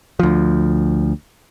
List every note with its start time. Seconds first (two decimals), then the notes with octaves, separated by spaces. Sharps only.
0.20 D2 F3